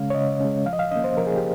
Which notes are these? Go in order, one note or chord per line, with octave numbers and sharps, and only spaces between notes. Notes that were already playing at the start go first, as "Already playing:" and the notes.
Already playing: C#3 G#3 C#4 F5
C#5
C#3 D#5
G#3 C#4
F3 F5
D#5
F5
A#3 C#4 D#5
C5
F3 A#4
G#4
G4